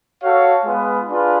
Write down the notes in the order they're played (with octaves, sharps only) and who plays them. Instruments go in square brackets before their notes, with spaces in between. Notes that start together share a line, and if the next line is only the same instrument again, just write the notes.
[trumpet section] F#4 A4 C#5 F5
G#3 B3 F4 B4
D4 F4 G#4 B4